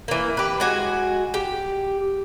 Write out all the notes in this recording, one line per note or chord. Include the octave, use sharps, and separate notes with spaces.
E3 A#3
G4 B4
G#3 F#4 G#5
G4